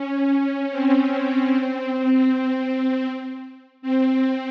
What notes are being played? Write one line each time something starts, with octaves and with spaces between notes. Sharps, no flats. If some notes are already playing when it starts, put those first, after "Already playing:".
Already playing: C#4
C4
C4